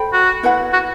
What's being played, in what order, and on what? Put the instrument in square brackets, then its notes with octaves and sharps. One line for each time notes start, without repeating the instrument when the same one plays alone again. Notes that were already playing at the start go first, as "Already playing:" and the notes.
Already playing: [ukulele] A4 C5 G5 B5
[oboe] F#4
[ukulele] E4 B4 F#5 B5
[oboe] F#4